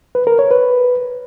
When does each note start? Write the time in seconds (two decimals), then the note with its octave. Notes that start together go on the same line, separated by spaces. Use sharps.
0.15 B4
0.27 A#4
0.39 C#5
0.51 B4